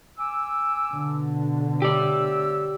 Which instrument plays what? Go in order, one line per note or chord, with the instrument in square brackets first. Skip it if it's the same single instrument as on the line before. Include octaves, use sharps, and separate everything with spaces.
[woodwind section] G#5 D6 E6
[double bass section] B2 D3
[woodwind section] A3 C#5 E6 [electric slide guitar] G4 D5